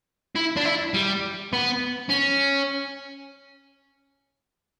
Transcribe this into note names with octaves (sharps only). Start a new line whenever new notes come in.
E4
D4
E4
G3
B3
C#4